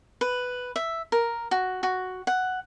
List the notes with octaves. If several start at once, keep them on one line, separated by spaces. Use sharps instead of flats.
B4
E5
A#4
F#4
F#4
F#5